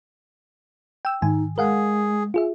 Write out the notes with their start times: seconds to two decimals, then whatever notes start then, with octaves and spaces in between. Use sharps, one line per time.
1.05 G5 E6
1.22 G#2 D#3 D#4 G#5
1.58 G#3 G#4 A#4 F5 F#5
2.34 F4 G#4 E5